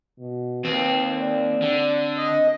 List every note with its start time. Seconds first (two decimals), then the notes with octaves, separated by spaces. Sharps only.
0.19 B2
0.65 D#2 C4 B4
1.21 D5
1.62 D3
2.17 D#5